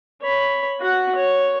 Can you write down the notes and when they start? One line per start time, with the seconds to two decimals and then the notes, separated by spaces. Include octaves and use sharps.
0.22 C#5 B5
0.80 F#4 F#5
1.15 C#5